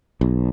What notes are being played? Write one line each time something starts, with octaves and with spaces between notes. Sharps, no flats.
B1